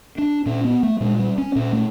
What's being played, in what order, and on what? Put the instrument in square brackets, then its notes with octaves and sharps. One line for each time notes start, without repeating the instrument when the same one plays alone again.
[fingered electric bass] D4
A#2 C#4
B3
A3
A#2 G#3
G3
C#4
A#2 C#4
A3